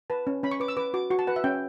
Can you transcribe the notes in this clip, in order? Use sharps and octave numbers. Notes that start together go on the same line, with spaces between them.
B4 A5
C#4
C#4 B5
C#6
B4 D6
E6
B4 D6
F#4 D6
F#4 C#6
A5
B4 F#5
E5
C#4 G5